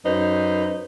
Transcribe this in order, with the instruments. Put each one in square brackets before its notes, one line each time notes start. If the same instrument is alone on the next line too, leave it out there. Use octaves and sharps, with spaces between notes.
[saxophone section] F#2 D#4 B4 C5